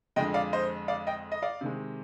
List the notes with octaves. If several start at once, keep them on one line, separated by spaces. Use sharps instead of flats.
F2 D3 G#3 D#5 G5
D5 F5
C5 D#5
D5 F5
D#5 G5
D#5
D5 F5
C3 D#3 G#3